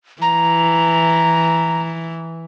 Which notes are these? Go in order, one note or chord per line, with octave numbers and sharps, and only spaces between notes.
E3 A#5